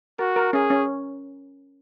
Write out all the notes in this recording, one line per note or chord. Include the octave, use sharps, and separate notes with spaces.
F#4 A#4
A#4
C#4 G#4
C#4